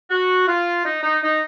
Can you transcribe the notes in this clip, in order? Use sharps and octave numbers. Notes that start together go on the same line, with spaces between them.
F#4
F4
D#4
D#4
D#4